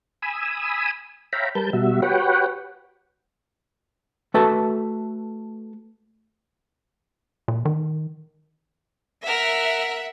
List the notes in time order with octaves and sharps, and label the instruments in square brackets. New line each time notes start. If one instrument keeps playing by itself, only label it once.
[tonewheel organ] G#5 B5 D#6 E6
C#5 E5 F5 G5 A#5 B5
G3 A#4 B4 A5 G6
B2 G3 F#4 E5
F#4 G4 B4 C#5 F#5 G5
[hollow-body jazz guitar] A3 F#4 A4 B4 E5 A5
[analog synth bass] A#2
D#3
[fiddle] A#4 [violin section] E5 F#5